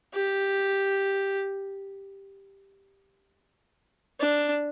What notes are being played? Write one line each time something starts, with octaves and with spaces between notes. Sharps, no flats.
G4
D4